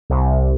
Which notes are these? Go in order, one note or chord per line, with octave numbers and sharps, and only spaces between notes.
C2